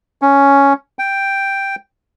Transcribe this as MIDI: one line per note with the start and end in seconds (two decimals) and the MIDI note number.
0.22 0.73 61
0.99 1.76 79